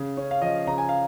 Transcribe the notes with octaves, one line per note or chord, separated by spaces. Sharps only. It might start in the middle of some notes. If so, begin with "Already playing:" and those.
Already playing: C#3
C#4
F5
F3 D#5
C#3 A#5
G#5
F5